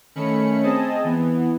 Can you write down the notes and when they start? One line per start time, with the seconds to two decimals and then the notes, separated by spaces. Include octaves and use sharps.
0.15 D#3 A3 C#4 B5 C#7
0.63 C4 G#4 D#5 A5
1.04 E3 B3